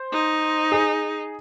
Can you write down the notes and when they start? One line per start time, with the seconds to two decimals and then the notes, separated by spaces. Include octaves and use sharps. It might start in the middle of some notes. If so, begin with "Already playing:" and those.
Already playing: C5
0.13 D#4
0.72 G#4